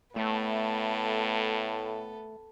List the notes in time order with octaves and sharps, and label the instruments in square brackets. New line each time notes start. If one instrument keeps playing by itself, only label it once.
[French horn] A2 [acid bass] A3 [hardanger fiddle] B3 A4